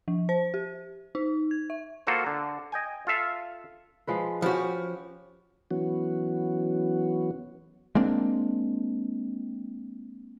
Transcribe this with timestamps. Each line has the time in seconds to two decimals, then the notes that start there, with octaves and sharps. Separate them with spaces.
0.08 F3
0.29 C5
0.54 G4
1.15 D#4
1.51 G#6
1.70 E5
2.07 A#3 F4 F#4 A4 C5
2.27 D3
2.72 D#5 G5 G#5
3.07 F4 A4 E5 F5
4.07 F3 G#3 B4
4.42 F3 C#4 F#4 G4 B4
5.71 E3 F#3 B3 C#4 F#4
7.95 G#3 A#3 C4 D4